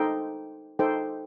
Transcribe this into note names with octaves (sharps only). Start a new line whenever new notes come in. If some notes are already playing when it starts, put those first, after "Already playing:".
Already playing: D#4 A4 C5 G5
D#4 A4 C5 G5